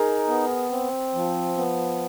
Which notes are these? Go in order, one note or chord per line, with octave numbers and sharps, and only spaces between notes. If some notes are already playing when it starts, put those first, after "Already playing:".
Already playing: D#4 G#4 A#4
B3
C4
F3
B3